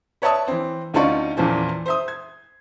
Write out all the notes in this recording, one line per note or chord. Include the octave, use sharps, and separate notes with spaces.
B4 C#5 D5 E5 A5 D#6
E3 C4
D2 C#4 D#4 F4 D5 C#6
E2 A#2 E3 F3 C#4
C5 E5 D#6
G#6